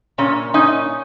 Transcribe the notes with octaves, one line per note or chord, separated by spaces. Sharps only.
A#2 C#4
C#4 D#4